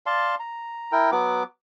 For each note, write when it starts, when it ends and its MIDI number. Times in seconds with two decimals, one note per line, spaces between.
0.06 0.35 74
0.06 0.35 77
0.06 0.35 81
0.06 0.35 84
0.40 0.92 82
0.92 1.10 64
0.92 1.10 70
0.92 1.10 79
1.12 1.43 54
1.12 1.43 59
1.12 1.43 86